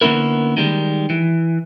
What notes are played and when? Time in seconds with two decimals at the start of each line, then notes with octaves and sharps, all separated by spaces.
0.01 D3 A#3 B3 C#4 E4 A#4
0.57 D#3 G3 G#3
1.10 E3